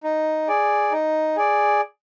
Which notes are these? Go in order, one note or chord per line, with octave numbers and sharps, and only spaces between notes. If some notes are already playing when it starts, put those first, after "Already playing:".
D#4
G#4 D5
D#4
G#4 D5